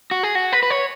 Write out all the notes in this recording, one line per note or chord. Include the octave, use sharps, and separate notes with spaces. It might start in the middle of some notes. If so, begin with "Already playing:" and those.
F#4
G#4
F#4
B4
B4
C#5